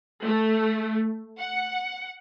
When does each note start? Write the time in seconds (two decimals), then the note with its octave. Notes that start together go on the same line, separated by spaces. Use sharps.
0.24 A3
1.38 F#5